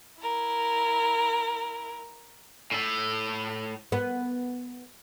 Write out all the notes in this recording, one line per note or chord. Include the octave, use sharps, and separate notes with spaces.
E4 A#4
A2 A4
B3